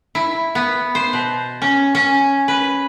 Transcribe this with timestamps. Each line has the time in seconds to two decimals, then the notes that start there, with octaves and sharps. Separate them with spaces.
0.15 E4
0.55 B3
0.95 C5
1.13 B2
1.62 C#4
1.95 C#4
2.48 B4